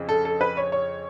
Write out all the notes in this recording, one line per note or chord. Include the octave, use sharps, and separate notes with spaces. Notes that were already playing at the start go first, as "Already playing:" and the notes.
Already playing: F2 C#3
A4
A4
B4
C#5
C#5